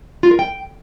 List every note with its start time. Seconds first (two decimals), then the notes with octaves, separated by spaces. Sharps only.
0.23 F4
0.31 A#4
0.39 G5